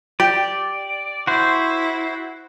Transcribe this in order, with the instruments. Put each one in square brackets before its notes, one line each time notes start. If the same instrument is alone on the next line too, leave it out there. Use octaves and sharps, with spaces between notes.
[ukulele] G4 [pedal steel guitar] D5
[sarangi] E4 [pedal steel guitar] F#4 C5